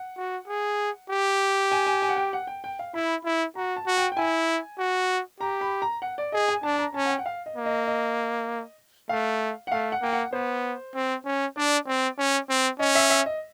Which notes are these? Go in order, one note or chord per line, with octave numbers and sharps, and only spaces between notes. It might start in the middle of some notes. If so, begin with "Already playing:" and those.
Already playing: F#5
F#4
G#4
G4
G#5
G#5
G#5
F#5
G5
F#5
G5
G5
F5
E4 B5
E4
F#4 A#5
A5
F#4
G5
G5
E4 G#5
F#4
G4 A#5
B5
A#5
F#5
D5
G#4 D#5
G#5
D4 A5
A5
A#5
C#4 A5
F#5
G5
F#5
F5
D#5
A#3
D#5
D#5
A3 F5
F#5
A3 F5
F#5
A#3 G5
F#5
B3 C5
C4
C#4
D4 D5
C4
C#4
C4
C#4 D#5
E5
E5
D#5